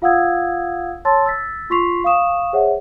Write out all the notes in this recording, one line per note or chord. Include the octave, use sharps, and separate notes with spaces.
F4 F5 F#5 D#6 E6 G#6
C#5 A5 C6 E6 A6
E6 A6 B6
F4 C6 C#6 B6 C7 F7
F5 C#6 D#6 E7
G#4 C5 C#5 E5 F#5